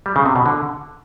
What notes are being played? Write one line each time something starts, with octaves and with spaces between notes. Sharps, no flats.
G3
C#3
C3
B2
D3